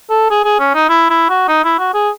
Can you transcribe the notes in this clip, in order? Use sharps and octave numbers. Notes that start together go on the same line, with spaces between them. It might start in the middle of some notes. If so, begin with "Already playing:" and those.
A4
G#4
G#4
C#4
D#4
E4
E4
F#4
D#4
E4
F#4
G#4